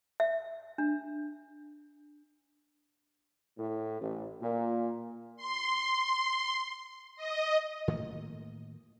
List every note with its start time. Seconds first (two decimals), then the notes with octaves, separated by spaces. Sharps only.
0.20 E5
0.78 D4
3.58 A2
4.00 A1
4.42 A#2
5.37 C6
7.17 D#5
7.88 A2 D#3 A3 A#3